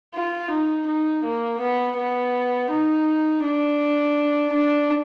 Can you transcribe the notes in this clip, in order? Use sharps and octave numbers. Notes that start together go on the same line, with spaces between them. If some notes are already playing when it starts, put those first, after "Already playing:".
F4
D#4
D#4
A#3
B3
B3
D#4
D4
D4